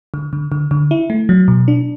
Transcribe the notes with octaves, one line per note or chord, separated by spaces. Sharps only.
D3
D3
D3
D3
E4
A3
F#3
B2
D4